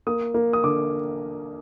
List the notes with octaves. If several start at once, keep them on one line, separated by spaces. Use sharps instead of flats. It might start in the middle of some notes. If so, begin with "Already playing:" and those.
A#3 D#6
A#3
D#6
D3 D6